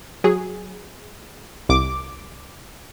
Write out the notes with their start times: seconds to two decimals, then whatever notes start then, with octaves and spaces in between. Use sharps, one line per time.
0.24 F#3 G#4
1.69 C2 D6